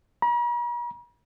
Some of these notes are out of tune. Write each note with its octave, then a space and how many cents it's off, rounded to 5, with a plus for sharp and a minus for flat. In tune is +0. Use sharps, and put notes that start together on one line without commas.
A#5 +45